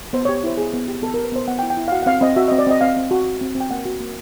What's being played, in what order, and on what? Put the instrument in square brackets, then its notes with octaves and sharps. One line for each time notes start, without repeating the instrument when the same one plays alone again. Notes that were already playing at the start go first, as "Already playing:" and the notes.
[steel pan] B3 C5
C#5
G4
C#5
E4 C5
B3 G#4
B3
G4
B3 A4
A#4
G4
B4
B3 C5
B3 F#5
G5
E4
G5
E4
F5
F#4 F#5
F#5
C4 F5
C4 D#5
F#4 E5
D#5
C4
D5
C4 D#5
C4 F5
C4
F#4
F#4
C4
C4
G5
A#3 F#5
F#4
A#3